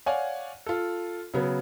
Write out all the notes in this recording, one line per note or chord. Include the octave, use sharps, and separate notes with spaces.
C#5 D5 F5 F#5 G#5
F4 A4
C#3 F#3 B3